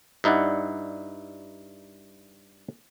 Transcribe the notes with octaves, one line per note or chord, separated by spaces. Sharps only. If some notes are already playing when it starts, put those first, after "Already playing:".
G2 D#4 E4 D5 F#5